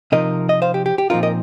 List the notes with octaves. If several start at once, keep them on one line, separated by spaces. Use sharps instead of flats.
C3 F3 D#4 A#4 D#5
D#5
C5 F5
G4
G4
G4
A#2 F3 C4 D#4 F4 A#4
A#4 D#5